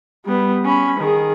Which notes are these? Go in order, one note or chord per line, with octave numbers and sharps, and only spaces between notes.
G3 B3
C#4 B5
D#3 G#4